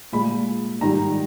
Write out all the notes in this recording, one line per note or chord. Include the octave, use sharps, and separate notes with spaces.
A#2 G#3 B5
G#2 D#3 G3 A#5